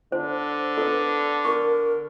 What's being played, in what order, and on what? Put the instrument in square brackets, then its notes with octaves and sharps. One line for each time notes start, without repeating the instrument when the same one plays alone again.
[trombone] D3 [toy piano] C5
[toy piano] A4 B4
[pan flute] A#4 [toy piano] C#6